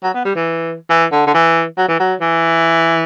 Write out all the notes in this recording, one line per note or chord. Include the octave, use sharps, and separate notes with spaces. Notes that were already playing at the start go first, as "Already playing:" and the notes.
F#3
B3
G3
E3
E3
D3
D3
E3
F#3
E3
F#3
E3